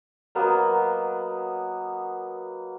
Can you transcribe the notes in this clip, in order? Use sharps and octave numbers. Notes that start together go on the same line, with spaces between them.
F#3 A#3 B3 D#5